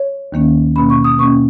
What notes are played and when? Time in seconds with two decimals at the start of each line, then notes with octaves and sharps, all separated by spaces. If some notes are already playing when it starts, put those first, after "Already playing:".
Already playing: C#5
0.32 D#2 D#3 A#3 C#4
0.76 B2 A#3 C#4 B5
0.90 C#6
1.04 D#6
1.18 B2 A#3 C#4 C#6